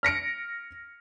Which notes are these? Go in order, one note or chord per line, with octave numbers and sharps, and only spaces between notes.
F6 A#6 C#7 D7